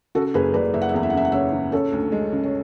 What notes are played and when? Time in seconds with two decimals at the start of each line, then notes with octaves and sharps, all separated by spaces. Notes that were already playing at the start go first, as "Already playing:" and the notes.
0.15 C#3 F#4 A4
0.34 F#1 G#4 B4
0.54 F#1 B4 D5
0.74 F#1 E5
0.81 F#5
0.89 E5
0.94 E2 F#5
1.03 E5
1.10 F#5
1.13 C#3 E5
1.25 F#5
1.32 C#3 C#5 E5
1.53 C#3
1.72 C#3 A4 C#5
1.92 D2
2.12 G#3
2.32 C#3
2.43 C#5